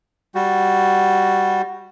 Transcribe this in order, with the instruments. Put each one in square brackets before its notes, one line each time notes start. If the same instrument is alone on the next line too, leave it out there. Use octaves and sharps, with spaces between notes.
[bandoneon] G3 F#4